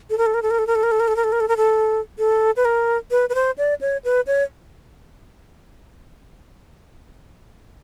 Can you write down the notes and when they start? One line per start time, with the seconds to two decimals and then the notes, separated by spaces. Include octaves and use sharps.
0.10 A4
0.18 A#4
0.26 A4
0.34 A#4
0.42 A4
0.50 A#4
0.59 A4
0.67 A#4
0.75 A4
0.83 A#4
0.91 A4
1.00 A#4
1.08 A4
1.16 A#4
1.24 A4
1.32 A#4
1.40 A4
1.48 A#4
1.57 A4
2.18 A4
2.56 B4
2.65 A#4
3.11 B4
3.29 B4
3.35 C5
3.58 D5
3.81 C#5
4.05 B4
4.27 C#5